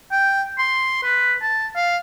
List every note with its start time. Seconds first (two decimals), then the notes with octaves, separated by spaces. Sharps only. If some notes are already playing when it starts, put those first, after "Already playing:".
0.12 G5
0.58 C6
1.03 B4
1.42 A5
1.75 F5